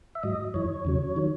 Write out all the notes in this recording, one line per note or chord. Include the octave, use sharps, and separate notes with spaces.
E5
G#2 F#3 D#5
F#2 E3 C#5
E2 C#3 F#3
D#3 F#3